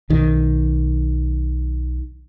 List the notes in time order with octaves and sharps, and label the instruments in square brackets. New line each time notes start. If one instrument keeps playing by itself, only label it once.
[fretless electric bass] B1 D#3